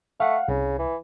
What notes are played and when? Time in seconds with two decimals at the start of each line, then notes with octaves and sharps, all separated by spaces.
0.20 A3 F5 F#5
0.48 C2 C#3
0.79 E3